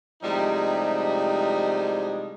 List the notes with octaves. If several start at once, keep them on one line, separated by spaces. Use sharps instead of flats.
A2 C3 F3 G3 G#3 D#4